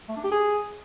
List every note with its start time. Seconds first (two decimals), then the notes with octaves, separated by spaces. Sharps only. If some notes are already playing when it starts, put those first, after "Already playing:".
0.09 A3
0.16 D4
0.24 G4
0.32 G#4